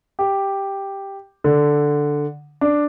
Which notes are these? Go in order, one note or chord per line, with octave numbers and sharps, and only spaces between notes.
G4
D3
D4